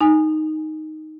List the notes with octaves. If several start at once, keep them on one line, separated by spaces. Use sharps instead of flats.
D#4 G#5